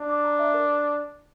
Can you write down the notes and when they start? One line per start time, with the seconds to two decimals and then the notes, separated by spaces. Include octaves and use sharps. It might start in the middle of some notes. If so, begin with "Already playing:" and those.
Already playing: D4
0.09 D6
0.24 A#5
0.39 E5
0.54 A#4